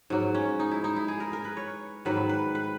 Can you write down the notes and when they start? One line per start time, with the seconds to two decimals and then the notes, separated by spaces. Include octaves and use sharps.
0.10 G#2 F#3
0.34 C#4
0.60 D#4
0.71 E4
0.84 D#4
0.96 E4
1.08 G#4
1.20 A#4
1.33 A#4
1.45 B4
1.57 C#5
2.05 G#2 D#3 F#3 B4
2.29 B4
2.55 B4